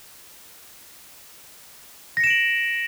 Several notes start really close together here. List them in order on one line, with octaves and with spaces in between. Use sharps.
A#6 C#7 E7 D7 F#7